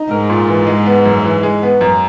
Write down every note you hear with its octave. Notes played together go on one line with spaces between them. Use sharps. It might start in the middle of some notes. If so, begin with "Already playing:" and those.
Already playing: D#4
G#2 A#4
A#2
E3
G#3
B3
F#2
E3
G#3
B3
F#2